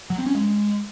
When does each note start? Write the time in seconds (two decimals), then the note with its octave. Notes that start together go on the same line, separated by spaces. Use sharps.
0.10 F#3
0.18 C4
0.26 C#4
0.35 G#3